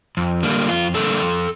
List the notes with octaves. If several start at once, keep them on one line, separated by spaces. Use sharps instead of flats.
F2
D3 G3 A#3
F2 F4
D3 G3 A#3 A4
F2